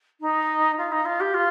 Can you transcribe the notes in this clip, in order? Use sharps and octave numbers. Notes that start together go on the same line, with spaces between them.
D#4
F4
D#4
F4
G4
F4